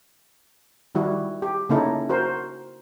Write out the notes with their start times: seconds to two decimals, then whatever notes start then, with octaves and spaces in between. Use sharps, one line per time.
0.95 D#3 G3 E4 F#4
1.42 G4
1.69 C#3 A#3 C#4 D#4 E4 A4
2.09 F#4 A#4 C5